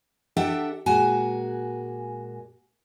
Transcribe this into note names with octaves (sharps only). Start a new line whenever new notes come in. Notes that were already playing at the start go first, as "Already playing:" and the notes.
D4 G4 A4 E5 F#5 G5
A#2 G#3 F#4 G#5